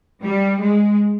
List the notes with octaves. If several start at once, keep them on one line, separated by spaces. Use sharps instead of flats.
G3
G#3